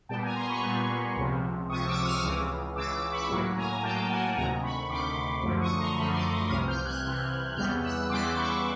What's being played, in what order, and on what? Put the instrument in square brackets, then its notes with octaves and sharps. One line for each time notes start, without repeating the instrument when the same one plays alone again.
[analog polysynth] A#2 G3 B3 G5 A5
G#5 A#5
A#5 C6
B5 C#6
A#2 G3 B3
C#2 C3 F3
C#2 C3 F3 C#6 D#6
D6 E6
D#6 F6
C#2 C#3 E3
C#2 C#3 E3 D6 E6
B5 C#6
A2 F#3 A#3
G#5 A#5
A2 F#3 A#3 G5 A5
F#5 G#5
D2 C3 D#3 G#5 A#5
B5 C#6
D2 C3 D#3 C6 D6
F#2 D3 F3 A3
C#6 D#6
A#5 C6
F#2 D3 F3 A3 B5 C#6
C6 D6
C#6 D#6
C2 C3 E3 D#6 F6
F6 G6
F#6 G#6
C2 C3 E3
E2 C#3 E3 G3 B3 F6 G6
E6 F#6
E2 C#3 E3 G3 B3 C6 D6
B5 C#6